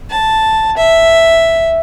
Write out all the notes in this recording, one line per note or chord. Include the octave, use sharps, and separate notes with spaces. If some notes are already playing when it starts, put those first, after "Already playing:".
A5
E5